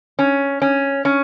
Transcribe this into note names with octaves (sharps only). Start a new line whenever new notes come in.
C#4
C#4
C#4